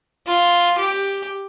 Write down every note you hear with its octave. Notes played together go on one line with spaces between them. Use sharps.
F4
G4